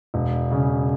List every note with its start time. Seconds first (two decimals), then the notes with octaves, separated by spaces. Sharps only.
0.14 E1
0.51 C#3